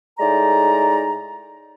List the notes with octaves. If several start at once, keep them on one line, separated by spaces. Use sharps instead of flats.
A2 G#3 D#4 D5 A#5